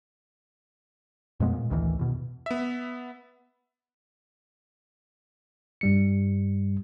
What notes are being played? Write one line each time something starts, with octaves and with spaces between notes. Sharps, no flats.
F2 A#2 G#3 B3
A#2
A1 D2 D#3 E3
E2 B2
B3 E5
G2 G3 C#7